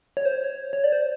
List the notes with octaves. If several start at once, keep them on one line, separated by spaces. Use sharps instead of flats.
C#5
C5
C#5
C#5
D5
C5